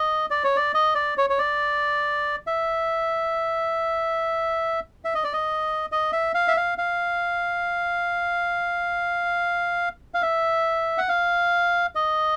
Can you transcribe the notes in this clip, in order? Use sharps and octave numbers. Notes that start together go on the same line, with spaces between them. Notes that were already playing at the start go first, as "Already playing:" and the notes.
Already playing: D#5
D5
C#5
D5
D#5
D5
C#5
C#5
D5
E5
E5
D#5
D5
D#5
D#5
E5
F5
E5
F5
F5
F5
E5
F#5
F5
D#5